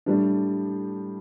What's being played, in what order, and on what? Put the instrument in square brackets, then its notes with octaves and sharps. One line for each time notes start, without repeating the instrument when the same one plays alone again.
[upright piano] A2 G3 D4